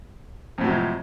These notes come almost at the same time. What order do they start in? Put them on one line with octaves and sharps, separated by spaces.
F2 A2 F#3 C3 F3